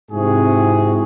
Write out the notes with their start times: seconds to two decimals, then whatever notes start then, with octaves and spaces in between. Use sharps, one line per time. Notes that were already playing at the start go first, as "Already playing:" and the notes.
0.11 G#2 C3 C4 E4 F#4 G#4